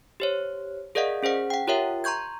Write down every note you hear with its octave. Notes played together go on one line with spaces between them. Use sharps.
G4 C5 C#5
G#4 A#4 D5 D#5 F5 F#5
C#4 G#4 C5 F#5
F#5 G5
F4 G4 A#4 C#5 E5 G5
A#5 C6 C#6 G6 G#6